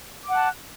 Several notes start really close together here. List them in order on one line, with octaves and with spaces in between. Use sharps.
D6 F#5 F#6 A5